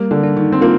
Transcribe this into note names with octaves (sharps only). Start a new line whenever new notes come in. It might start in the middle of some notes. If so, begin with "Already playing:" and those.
Already playing: G3 A#3
D3
D4
D#3
C4
A#3 F4